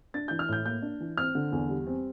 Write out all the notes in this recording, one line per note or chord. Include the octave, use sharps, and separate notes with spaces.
D4 A6
E3 G6
F6
A2 G6
A#3 G6
D4
E3
C4 F6
D3
E2
G3
C4